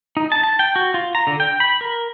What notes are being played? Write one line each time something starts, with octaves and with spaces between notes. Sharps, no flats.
D#4
A5
A5
G5
F#4
F4
A#5
D3
G5
B5
A#4